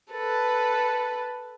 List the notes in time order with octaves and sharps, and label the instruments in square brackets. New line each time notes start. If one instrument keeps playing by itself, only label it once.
[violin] A4 B4